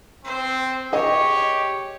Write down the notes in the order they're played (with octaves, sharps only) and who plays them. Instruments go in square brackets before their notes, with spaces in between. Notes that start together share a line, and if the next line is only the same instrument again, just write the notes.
[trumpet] C4 [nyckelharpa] C5
[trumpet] G4 [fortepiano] G#4 D#5 [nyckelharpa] C#5